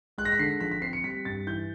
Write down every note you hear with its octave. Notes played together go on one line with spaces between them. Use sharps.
G#3 F#6
A#6
B6
D3 C7
F3 B6
B6
C4 C7
C#7
G3 B6
G2 A6
E3 G6